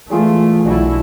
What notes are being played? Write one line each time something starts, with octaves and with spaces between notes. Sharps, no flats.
E3 A3 F4 G#4 D5
B1 D4 E4 F#4 A5